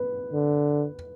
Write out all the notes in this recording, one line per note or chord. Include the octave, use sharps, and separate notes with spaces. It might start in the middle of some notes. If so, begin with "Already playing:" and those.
Already playing: B4
D3